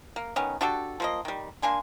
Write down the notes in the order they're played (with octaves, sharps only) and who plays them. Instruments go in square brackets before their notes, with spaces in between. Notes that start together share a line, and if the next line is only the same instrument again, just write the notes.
[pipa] A#3
D#3 B3 C#4
D4 F#4 G4 A4
F3 A#3 D#5
D#3 G3
A#3 D4 G#5 C6